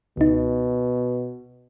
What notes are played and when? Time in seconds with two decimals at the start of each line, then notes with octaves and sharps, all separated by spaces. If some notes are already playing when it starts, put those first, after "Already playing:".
0.17 C#2 B2 D#4